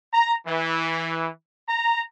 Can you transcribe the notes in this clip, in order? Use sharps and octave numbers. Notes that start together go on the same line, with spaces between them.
A#5
E3
A#5